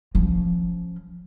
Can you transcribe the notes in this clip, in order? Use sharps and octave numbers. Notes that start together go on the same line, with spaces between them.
F3 C#4